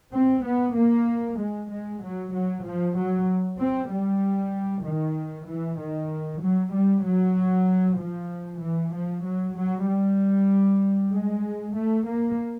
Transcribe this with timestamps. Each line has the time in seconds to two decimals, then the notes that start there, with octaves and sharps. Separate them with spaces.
0.14 C4
0.46 B3
0.77 A#3
1.40 G#3
1.72 G#3
2.04 F#3
2.34 F#3
2.67 F3
2.98 F#3
3.60 C4
3.91 G3
4.86 D#3
5.49 E3
5.80 D#3
6.43 F#3
6.74 G3
7.05 F#3
7.99 F3
8.62 E3
8.94 F3
9.25 F#3
9.57 F#3
9.88 G3
11.14 G#3
11.76 A3
12.08 A#3